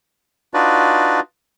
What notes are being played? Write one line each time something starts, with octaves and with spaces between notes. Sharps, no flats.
D4 D#4 F4 F#4 B4 D5